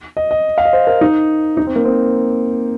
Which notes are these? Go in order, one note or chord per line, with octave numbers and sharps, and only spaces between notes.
D#5
D#5
F5
D#5
C5
A#4
D#4
D#4
C4
A#3
C4